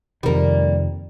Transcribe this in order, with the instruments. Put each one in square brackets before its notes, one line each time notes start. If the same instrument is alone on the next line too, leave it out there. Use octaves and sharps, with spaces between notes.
[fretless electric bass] F2 C3 D#3 [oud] G3 A#3